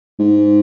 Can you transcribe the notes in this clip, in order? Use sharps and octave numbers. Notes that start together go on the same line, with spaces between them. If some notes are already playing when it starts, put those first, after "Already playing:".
G#2